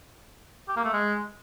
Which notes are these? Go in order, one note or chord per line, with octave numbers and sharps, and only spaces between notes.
G4
A#3
A3
G#3